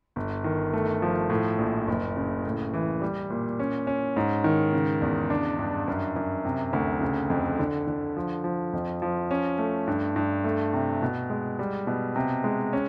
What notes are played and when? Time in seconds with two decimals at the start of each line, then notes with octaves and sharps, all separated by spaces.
0.16 G1
0.44 D#3
0.73 A3
1.02 F3
1.30 A2
1.59 A#1
1.88 F#1
2.17 C#3
2.45 A2
2.73 E3
3.01 G3
3.30 A#2
3.60 C#4
3.87 C#4
4.16 G#2
4.44 D#3
4.73 C#3
5.02 E2
5.30 D4
5.59 G2
5.88 F#2
6.16 F#2
6.45 C3
6.73 D2
7.01 C#3
7.30 F2
7.59 D3
7.87 D3
8.17 F3
8.44 F3
8.73 F2
9.02 F3
9.31 C#4
9.58 A3
9.87 G2
10.16 G2
10.44 A3
10.73 C3
11.02 B2
11.30 G#3
11.59 G3
11.87 B2
12.16 C3
12.44 G#3
12.73 C#4